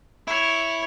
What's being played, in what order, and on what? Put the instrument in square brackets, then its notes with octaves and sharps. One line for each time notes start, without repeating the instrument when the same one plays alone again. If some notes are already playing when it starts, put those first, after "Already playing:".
[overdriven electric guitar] E4 [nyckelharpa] C#5